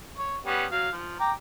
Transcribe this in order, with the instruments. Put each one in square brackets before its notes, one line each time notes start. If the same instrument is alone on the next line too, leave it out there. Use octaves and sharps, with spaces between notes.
[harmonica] C#5
G3 B3 C#4
F#3 F5
F3
G5 A#5 D6